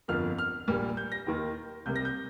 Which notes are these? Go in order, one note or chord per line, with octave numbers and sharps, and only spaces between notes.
G1 F2 F3 A#3 F6
F6
A#1 A#2 G3 A#3
G6
A#6
D#2 D#3 A#3
C2 C3 G3 A#3 G6
A#6
G6